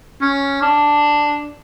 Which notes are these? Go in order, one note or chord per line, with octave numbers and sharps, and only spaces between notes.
C#4
D4